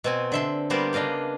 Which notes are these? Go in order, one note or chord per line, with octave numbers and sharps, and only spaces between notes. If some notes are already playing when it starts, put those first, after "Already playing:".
B2 C4 G#5
D3 E5 C6
G3 A#3 B3 A#4 C5 D5
C#3 D4 D#5 F5 G5